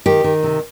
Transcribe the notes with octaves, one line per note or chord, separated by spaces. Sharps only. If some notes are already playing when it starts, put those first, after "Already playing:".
D#3 G4
D#3
C3